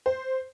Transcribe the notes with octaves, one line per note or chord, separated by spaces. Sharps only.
C5